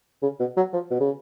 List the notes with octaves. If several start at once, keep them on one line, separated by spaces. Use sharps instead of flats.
C#3
B2
F#3
F3
B2
C#3